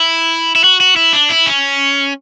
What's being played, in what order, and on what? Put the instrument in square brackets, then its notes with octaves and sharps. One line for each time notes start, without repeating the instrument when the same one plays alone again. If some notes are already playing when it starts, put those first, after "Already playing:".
Already playing: [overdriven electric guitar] E4
E4
F#4
F#4
E4
D4
E4
C#4